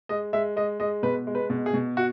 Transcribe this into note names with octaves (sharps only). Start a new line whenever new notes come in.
G#3 D#5
G#3 E5
G#3 D#5
G#3 D#5
B2 B4
G#3
B4
B2
G#4
B2
F#4